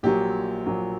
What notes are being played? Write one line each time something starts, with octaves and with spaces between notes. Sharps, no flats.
A#1 A#2 F#3 G4
A#1 A#2 F#3